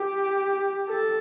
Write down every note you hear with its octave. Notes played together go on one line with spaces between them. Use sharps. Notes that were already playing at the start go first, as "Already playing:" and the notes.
Already playing: G4
A4